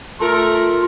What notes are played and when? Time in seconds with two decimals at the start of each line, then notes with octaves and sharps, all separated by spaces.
0.20 A3 F4 A#4